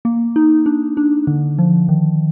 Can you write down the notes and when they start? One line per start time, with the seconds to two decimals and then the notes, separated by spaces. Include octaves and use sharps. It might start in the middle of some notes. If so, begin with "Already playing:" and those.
0.05 A#3
0.36 D#4
0.66 D4
0.97 D4
1.27 D3
1.58 F3
1.89 D#3